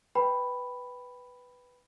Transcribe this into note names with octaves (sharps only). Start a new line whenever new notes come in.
B4 G5 B5